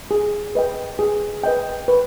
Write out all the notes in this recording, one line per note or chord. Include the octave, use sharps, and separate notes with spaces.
G#4
B4 D#5 G5
G#4
B4 D#5 G5
B4